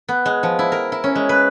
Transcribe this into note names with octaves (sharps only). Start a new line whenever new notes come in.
B3
G#3
F3
E4
A#4
E4
C#4
G#3
B4